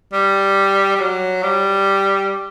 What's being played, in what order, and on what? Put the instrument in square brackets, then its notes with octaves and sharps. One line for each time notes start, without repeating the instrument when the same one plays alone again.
[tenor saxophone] G3
G3
F#3
G3